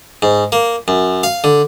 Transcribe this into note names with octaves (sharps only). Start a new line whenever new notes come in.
G#2
A#3
F#2
F5
D3